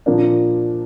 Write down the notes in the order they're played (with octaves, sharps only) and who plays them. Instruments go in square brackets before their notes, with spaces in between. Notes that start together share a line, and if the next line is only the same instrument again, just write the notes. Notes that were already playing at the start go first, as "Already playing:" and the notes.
[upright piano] A#2 F3 A#3 D4